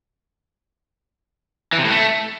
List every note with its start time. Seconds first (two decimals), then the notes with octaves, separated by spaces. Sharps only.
1.73 E3
1.79 C3
1.85 A2
1.91 A3